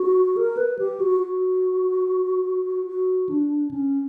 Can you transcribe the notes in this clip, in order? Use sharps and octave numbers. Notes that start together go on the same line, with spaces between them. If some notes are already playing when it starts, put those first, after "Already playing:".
Already playing: F#4
A#4
B4
G4
F#4
F#4
F#4
D4
C#4